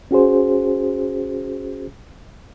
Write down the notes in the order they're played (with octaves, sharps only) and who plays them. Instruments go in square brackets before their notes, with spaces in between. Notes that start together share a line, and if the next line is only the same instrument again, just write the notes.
[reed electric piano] C#4 F#4 G#4 C5